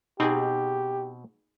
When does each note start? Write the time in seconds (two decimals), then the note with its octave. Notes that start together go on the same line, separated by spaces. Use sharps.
0.20 B2 C4 D#4 G4 G#4